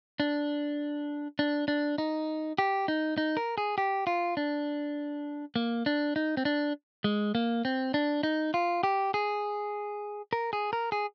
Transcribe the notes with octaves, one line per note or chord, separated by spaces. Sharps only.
D4
D4
D4
D#4
G4
D#4
D#4
A#4
G#4
G4
F4
D4
A#3
D4
D#4
C4
D4
G#3
A#3
C4
D4
D#4
F4
G4
G#4
A#4
G#4
A#4
G#4